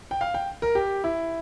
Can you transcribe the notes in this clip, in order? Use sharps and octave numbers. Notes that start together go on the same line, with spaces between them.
G5
F5
G5
A#4
G4
E4